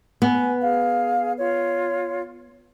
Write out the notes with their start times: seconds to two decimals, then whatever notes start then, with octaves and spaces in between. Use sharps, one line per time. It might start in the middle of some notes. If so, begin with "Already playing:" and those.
0.22 B3 G#5
0.61 G#4 F5
1.38 F4 C#5